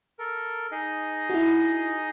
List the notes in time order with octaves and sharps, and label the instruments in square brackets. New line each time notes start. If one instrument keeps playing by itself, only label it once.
[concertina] A4 A#4
D#4 G#4 D#5
[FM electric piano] E4 F#4